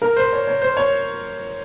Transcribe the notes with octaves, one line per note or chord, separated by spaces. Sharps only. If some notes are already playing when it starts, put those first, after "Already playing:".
A#4
C5
C#5
C#5
C5
C#5